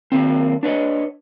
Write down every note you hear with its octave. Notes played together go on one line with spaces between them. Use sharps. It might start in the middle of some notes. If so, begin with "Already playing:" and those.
D#3 F#3 A#3 C4
D4 B4 C#5 D#5